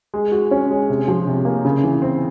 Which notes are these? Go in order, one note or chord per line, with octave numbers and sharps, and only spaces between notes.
G#3
F#4
C#4
G#3
C3
F3
C3
A#3
C#3
E3
C4